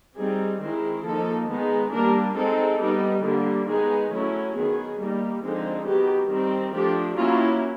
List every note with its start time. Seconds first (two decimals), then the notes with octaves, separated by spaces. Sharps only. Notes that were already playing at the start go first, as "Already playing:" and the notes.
0.17 G3 C4 D#4 G#4
0.62 D#3 G#3 C4 E4
1.05 F3 A#3 D#4 A4
1.49 D#3 G#3 B3 D#4
1.92 G3 A#3 D4 A#4
2.36 G#3 C4 D#4 A4
2.80 G3 B3 D#4
3.24 D3 G3 A#3
3.67 D#3 G#3 B3 D#4 G#4
4.12 F#3 A3 C#4 E4
4.55 D#3 F#3 B3 G#4
4.98 G3 A#3 D#4
5.42 D3 F3 G#3 C4 D#4
5.86 D#3 F#3 B3 G4
6.30 D#3 G3 C4 D#4
6.74 F3 A3 D4 G4
7.17 F#3 A#3 C#4 E4 F4